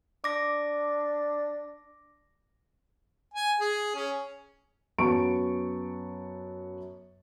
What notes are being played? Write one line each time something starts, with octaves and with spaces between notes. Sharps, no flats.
D4 D6 A#6
G#5
G#4
C#4
F#2 B3 A5 C#6 D7